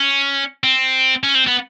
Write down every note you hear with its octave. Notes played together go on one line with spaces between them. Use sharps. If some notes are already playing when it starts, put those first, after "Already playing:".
Already playing: C#4
C4
C#4
C4
B3